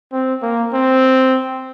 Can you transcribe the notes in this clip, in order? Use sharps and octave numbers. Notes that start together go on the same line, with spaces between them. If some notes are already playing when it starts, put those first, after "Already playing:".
C4
A#3
C4